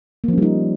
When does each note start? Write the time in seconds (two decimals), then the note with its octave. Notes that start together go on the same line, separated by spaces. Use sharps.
0.24 A#3
0.28 F3
0.33 C#4
0.38 G3
0.42 D#4